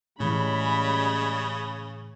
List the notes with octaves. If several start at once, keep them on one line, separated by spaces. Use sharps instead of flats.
A2 C#3 E3 G3 G#3 C#4 B5